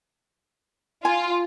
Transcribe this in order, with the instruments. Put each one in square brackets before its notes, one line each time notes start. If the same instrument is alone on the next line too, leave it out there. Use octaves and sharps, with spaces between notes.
[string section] F4 [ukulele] G#5